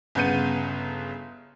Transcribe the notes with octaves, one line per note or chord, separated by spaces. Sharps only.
G1 C#3 B3 G6 C#7 D#7